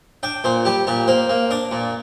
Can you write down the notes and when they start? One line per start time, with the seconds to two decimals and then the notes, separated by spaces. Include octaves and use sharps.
0.23 D4 G5
0.44 A#2 C5
0.65 G3 G4
0.87 A#2 G4
1.08 A#3 C5
1.29 A#3
1.51 D4 D5
1.71 A#2